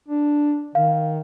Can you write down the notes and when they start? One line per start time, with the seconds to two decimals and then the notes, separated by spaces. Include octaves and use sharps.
0.08 D4
0.75 D#3 F5